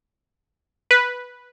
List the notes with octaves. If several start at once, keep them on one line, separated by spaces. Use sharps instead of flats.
B4